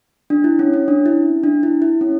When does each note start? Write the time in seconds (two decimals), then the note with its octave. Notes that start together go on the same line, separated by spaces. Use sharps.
0.30 D4
0.44 E4
0.59 C#4
0.73 C#4
0.88 D4
1.06 E4
1.44 D4
1.63 E4
1.82 E4
2.01 C#4